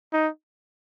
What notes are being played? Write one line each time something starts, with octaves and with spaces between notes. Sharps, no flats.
D#4